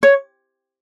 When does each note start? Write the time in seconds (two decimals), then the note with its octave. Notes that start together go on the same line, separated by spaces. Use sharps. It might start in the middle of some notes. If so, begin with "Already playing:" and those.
0.03 C#5